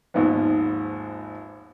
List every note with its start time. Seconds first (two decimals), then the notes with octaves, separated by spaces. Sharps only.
0.14 G#1 D#2 G#2 F3 B3